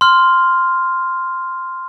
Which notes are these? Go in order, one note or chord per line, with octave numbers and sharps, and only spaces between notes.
C6 F6